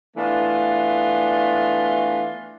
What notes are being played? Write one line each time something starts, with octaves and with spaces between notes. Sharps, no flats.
E3 A3 B3 D4 F4